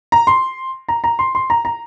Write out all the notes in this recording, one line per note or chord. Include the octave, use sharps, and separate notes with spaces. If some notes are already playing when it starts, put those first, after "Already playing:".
A#5
C6
A#5
A#5
C6
C6
A#5
A#5